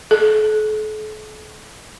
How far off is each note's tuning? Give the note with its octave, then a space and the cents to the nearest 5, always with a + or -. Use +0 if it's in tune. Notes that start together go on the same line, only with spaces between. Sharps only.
A4 -40